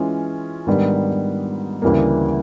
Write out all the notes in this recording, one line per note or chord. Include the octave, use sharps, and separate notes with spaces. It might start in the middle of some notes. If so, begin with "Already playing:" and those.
Already playing: E3 G#3 C#4 F4
G#2 D#3 G3 B3 D4
D2 C#3 E3 G3 A#3